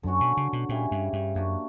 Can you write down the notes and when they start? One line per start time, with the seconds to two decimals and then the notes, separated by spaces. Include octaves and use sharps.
0.03 F#2 D3 F#3 C#4 F#4
0.21 B2
0.37 C#3
0.53 B2
0.69 A#2 C#3 G3 C#4 E4
0.91 G2
1.13 G2
1.35 F#2 A#3 D4 F#4